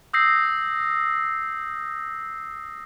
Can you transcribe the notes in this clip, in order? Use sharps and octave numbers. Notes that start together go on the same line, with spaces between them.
D#6 E6 G6 A#6 C7